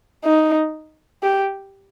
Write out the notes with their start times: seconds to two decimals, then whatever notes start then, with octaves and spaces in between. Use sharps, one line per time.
0.25 D#4
1.23 G4